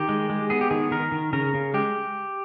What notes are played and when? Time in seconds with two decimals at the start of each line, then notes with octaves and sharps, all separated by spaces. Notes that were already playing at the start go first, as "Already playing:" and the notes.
Already playing: D#3 G4
0.09 G#3
0.30 G#3
0.50 B3 G#4
0.61 G4
0.71 D#3 G#4
0.91 D#3 A#4
1.12 D#3
1.33 C#3 A#4
1.54 C#3
1.74 G#3 G4